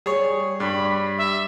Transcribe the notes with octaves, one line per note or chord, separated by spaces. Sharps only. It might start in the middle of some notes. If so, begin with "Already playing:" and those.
G3 G#4 C#5
G2 B5
E5